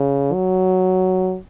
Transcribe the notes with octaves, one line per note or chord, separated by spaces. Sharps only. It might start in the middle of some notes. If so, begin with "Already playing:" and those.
Already playing: C#3
F#3